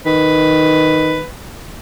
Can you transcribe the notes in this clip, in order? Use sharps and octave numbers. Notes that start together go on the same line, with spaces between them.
D#3 B4